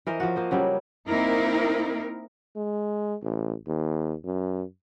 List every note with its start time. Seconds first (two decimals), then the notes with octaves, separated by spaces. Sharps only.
0.07 E3 A#4 C5 D#5
0.20 F3 F#4
0.36 A#3 C5 D#5
0.51 C#3 F#3 G3
1.08 A#3 C4 D#4 E4 A#4
2.56 G#3
3.23 A1
3.67 D#2
4.25 F#2